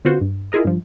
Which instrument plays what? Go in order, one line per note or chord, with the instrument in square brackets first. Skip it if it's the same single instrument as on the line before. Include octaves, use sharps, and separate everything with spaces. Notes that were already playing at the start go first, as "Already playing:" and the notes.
[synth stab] D3 B3 C4 F4 F#4 C5
G2
E4 F4 G#4 A#4 D#5
G2 F3